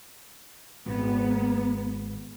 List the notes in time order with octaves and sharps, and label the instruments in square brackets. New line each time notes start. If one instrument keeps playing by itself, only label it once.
[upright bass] G#1 [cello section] B3